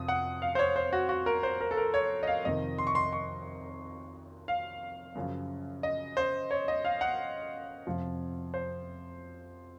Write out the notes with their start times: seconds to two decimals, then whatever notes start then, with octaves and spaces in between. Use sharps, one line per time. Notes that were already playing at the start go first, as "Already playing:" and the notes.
Already playing: F2 C3 F3 D#6
0.08 F#5
0.42 F5
0.55 C5
0.59 C#5
0.76 C5
0.93 F#4
1.09 F#4
1.26 A#4
1.43 C5
1.61 A#4
1.71 A4
1.77 A#4
1.94 C#5
2.23 D#5
2.27 F5
2.45 F2 C3 D#3 D#5
2.78 C6
2.87 C#6
2.95 C6
3.13 C#6
4.48 F5
5.15 F#2 C#3 F3
5.83 D#5
6.17 C5
6.51 C#5
6.68 D#5
6.85 F5
7.01 F#5
7.87 F2 C3 F3
8.54 C5